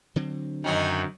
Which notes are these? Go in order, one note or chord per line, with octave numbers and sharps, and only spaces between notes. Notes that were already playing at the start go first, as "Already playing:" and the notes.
D3 F#3 C4
F#2 D#3 C#4 D#4